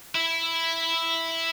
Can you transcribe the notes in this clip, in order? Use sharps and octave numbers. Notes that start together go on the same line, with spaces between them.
E4